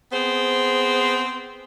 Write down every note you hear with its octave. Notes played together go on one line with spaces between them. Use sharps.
B3 C4 G#4 C5